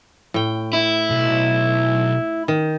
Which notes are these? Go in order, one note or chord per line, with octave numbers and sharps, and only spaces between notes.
A2 G5
E4
B1
D#3